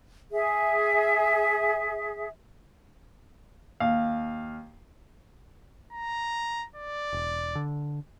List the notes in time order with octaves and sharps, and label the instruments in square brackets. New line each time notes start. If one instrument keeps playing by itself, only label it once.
[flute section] G#4 E5
[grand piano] D#2 F5
[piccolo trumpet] A#5
D5
[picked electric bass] E1
D3